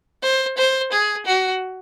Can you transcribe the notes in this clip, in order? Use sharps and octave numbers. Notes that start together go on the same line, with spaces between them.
C5
C5
G#4
F#4